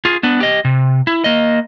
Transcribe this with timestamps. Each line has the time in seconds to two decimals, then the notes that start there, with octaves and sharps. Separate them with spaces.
0.05 F4 G#4
0.23 B3 D4
0.40 G4 D#5
0.65 C3
1.07 E4
1.24 A#3 D#5